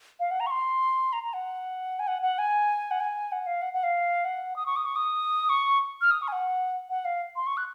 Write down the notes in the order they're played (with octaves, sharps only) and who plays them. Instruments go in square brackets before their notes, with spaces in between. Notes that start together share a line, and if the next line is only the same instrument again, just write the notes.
[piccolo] F5
F#5
A#5
C#6
C6
A#5
A#5
F#5
G#5
F#5
F#5
G#5
F#5
G#5
F#5
F5
F#5
F#5
F5
F#5
D#6
C#6
D#6
C#6
D#6
C#6
F6
D#6
C#6
G#5
F#5
F#5
F5
C6
C#6
F#6